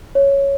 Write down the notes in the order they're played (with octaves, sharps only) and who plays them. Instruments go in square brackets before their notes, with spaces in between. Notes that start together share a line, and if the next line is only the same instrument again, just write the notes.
[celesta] C#5